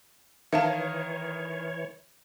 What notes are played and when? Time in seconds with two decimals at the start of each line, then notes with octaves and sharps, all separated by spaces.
0.53 D#3 E3 C#5 E5 F5 A5